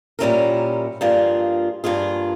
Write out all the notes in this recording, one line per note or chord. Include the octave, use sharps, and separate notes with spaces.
A#2 G3 C#4 E4 A#4
G2 F3 A#3 F4 G#4
G2 F3 A#3 F4 G#4